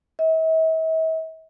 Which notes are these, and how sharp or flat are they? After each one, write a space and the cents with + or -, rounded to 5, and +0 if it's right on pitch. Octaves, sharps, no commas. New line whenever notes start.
E5 -45